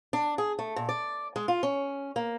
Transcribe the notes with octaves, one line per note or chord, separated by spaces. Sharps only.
D4
G#4
A3
A#2
D5
G#3
F4
C#4
A#3